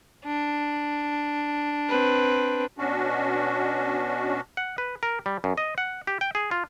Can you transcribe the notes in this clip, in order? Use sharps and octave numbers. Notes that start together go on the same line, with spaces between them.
D4
C4 B4
B2 C#4 D4 F#4
F#5
B4
A#4
G3
F#2
D#5
F#5
G4
G5
G#4
F4